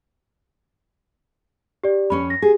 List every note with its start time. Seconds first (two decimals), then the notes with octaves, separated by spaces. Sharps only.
1.84 G4 D5
2.10 F2 C#4 C#5 B5
2.30 A#6
2.42 G4 G#4